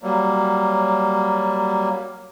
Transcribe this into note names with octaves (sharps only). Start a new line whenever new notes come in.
F#3 G3 A#3